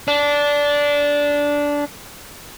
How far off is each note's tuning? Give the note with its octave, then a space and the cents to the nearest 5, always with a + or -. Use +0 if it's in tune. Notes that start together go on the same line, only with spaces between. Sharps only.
D4 -15